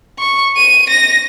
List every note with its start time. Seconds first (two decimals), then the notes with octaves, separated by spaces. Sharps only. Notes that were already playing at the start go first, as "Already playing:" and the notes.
0.19 C#6
0.56 D#7
0.90 A#6